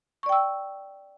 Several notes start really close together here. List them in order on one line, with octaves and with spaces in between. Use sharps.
C#6 D5 G5 E6